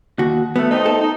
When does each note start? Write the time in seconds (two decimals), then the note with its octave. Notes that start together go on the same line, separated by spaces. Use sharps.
0.19 D#2 F#4
0.56 A3 B3
0.70 A3 C4 D#4
0.86 A4
1.01 D#4